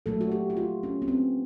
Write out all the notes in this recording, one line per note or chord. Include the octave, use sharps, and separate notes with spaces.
A#2 F#3 A3 A4
F#4
G4
F#4
F4
C#4
B3
C4